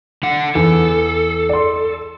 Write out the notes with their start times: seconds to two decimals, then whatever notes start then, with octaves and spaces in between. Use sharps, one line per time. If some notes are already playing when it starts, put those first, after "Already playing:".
0.23 D3 F#5
0.55 E2 A4
1.49 D5 C6